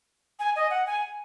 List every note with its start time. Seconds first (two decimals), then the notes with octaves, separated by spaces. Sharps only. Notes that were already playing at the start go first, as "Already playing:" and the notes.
0.40 G#5
0.56 D#5
0.71 F#5
0.87 G#5